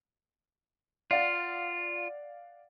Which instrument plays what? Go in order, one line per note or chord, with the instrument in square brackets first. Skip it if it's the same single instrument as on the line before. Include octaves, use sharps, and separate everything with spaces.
[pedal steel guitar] F4 [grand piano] D5 F5 F#5